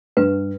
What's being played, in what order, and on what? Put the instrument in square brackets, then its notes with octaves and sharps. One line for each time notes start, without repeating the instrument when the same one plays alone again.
[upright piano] G2 [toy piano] B4